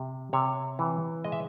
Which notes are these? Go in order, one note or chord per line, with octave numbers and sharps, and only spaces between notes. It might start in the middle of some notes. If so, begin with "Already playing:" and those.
Already playing: C3
C3 C#5
E3
G#3 D#5
E5